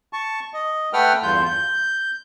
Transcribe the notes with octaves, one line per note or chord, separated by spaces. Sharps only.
A5 C#6
D#5
A3 A4 B4 F#5 G5 F6
E2 G2 F4 G6
G6